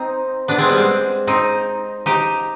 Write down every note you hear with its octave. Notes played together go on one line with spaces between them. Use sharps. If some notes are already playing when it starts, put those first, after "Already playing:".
Already playing: C4 D#4
B3 D4
G#3 C4
G3 B3
G#3 C4
C4 D#4
D#4 G4